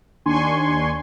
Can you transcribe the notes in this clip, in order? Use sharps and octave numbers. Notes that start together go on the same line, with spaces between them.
D#2 D4 G#5 C6 C#6